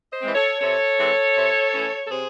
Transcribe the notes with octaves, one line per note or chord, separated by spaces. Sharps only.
C5 D#5
E3 G#3 C4
A4 C#5
C3 A4 C#5
E3 G#3 C4
C3
E3 A3 C#4
A4
C3 G#4 C5